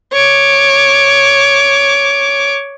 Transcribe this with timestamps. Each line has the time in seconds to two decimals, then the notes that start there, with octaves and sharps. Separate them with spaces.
0.13 C#5 D6